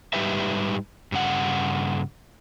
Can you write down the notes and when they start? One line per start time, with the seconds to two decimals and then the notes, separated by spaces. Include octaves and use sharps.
0.13 G#2 G3 D#4 G4 B4 E5
1.12 G2 C#3 F#5